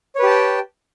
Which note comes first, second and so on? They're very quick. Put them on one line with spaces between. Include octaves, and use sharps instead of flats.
C#5 B4 G4 A5 G5